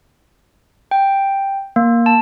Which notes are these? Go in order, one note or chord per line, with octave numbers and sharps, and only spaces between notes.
G5
A#3
A5